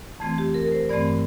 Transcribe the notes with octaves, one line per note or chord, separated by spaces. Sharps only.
F2 E3 A3 C4
G4
A#4
A#4
C5
G2 E3 A3 C4 D5